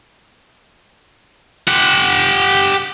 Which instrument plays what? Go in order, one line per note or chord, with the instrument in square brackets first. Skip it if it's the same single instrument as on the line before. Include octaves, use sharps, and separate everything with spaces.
[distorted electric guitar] G4 F#5